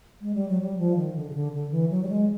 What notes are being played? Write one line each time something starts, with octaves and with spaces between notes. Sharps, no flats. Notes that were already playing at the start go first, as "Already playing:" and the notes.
G#3
G3
F#3
G3
F3
D#3
D3
C#3
D3
D3
E3
F#3
G3
G#3